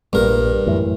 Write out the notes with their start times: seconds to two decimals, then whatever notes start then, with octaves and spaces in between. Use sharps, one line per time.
0.13 A#1 G2 A#2 G3 A#4
0.66 F#2 A2 E3